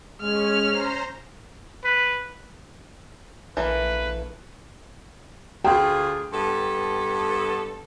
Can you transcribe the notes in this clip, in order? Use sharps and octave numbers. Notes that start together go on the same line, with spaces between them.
G#3 C#4 F6
C5 A#5
B4
A#1 E3 A3 A#3 B4
D2 F4 G#4 G5
G2 B3 A4